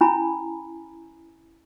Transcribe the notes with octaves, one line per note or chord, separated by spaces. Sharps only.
C#4 E4 G#5 A#5 B5